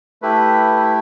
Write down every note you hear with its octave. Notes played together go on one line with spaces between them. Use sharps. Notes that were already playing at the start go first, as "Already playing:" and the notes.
A3 E4 G4 B4